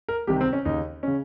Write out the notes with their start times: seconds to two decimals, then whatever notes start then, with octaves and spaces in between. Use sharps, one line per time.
0.08 A#4
0.27 C2 C3 D#3 G4
0.41 C4
0.53 C#4
0.65 D#2 C#3 D#4
1.03 C#3 C#4